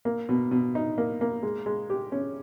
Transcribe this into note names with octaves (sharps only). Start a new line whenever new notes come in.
A#3
B2
B2
D#4
A#3
A#3
G#3
G#3
G4
C#4